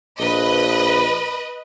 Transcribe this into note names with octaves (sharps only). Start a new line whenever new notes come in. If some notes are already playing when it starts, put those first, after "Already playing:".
A#1 B4 D#5